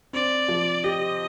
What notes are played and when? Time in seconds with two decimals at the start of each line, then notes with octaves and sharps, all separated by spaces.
0.13 C4 D5
0.48 F3
0.84 G4 D#5